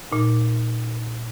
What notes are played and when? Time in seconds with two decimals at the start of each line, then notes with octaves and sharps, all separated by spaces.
0.11 A#2 D#4